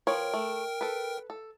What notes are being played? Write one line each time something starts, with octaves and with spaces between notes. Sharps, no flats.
F3 A#4 B4 C#5 G5
A3
A4 B4
A4